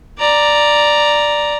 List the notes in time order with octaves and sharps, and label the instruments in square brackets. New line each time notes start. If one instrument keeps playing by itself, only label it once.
[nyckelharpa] D5 A#5